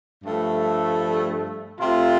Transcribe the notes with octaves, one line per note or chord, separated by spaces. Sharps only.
G2 F3 A3
C3 A3 C4 F4